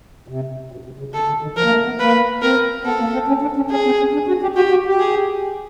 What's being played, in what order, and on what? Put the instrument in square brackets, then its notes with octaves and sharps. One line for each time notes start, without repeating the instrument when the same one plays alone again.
[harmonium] C3
B2
C3
C#3
[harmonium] D3 [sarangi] A4
[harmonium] D3
D#3
[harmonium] F3 [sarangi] A#4
[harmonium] A#3
A3
B3
[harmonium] A#3 [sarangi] B4
[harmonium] C4 [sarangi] A#4
[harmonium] B3 [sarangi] A4
[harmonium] A#3
C4
C#4
D4
C#4
[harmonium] C#4 [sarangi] G#4
[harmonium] C4
C#4
D4
F#4
G4
[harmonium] F#4 [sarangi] G4
[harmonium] F#4
G4
[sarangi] G#4